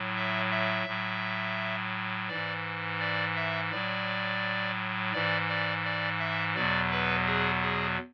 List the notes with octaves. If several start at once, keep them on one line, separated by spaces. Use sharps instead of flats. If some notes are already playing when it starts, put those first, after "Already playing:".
Already playing: A2 F#3
E5
E5
A2 F#3
G#2 E3 D5
D5
E5
A2 F#3 D5
G#2 E3 D5
D5
D5
E5
E2 B2 F#3 D5
B4
G#4
G#4